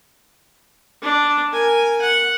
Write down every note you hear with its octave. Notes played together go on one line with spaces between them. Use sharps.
D4
A#4 G#5
F#5